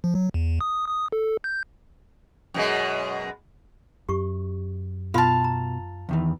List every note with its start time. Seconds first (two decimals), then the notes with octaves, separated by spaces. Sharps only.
0.04 F3
0.15 F#3
0.34 E2
0.61 D#6
0.89 D#6
1.12 A4
1.44 G6
2.54 F#2 B2 G#3
4.09 F#2 G4 C#6
5.14 B2 F4 F5 A5 C6
5.44 A#5
6.09 E2 D#3 E3